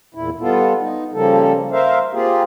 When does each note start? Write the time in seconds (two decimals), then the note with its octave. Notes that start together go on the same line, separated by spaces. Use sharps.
0.14 E2 A#2 E4
0.40 G3 B3 F4 A4
0.79 D#4
1.14 C#3 F3 G3 A#3 A4
1.72 A#4 C5 E5 F5
2.13 A#3 C4 F4 G4 G#4